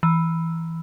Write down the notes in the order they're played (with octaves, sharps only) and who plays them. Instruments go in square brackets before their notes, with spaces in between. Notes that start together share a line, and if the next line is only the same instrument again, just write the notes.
[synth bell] E3